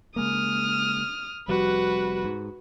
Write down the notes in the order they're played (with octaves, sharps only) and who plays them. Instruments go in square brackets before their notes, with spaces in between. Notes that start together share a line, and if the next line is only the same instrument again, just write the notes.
[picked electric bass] C#3 G#3 A#3 [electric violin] D#6 F6
[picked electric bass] F1 F2 G3 [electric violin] F#4 B4
[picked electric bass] G#2